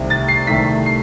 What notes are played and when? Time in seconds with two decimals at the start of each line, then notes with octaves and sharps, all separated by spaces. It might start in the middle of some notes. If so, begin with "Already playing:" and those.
Already playing: C2 C3 D#3 A3 E4
0.10 A6
0.28 C7
0.47 C2 C3 D#3 A3 E4 B6
0.86 C7